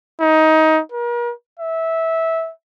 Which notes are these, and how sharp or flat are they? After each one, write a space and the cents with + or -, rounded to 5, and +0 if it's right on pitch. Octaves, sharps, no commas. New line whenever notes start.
D#4 +20
A#4 +40
E5 -15